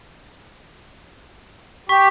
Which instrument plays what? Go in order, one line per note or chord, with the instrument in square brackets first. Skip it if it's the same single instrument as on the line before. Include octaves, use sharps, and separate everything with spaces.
[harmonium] G4 [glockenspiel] C#6 B6